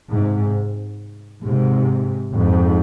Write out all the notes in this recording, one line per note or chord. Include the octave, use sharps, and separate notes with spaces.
G#2 C3
G#2 C3
F2 G#2